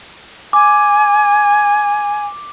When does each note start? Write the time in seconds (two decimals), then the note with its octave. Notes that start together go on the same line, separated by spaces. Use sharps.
0.53 G#5 D6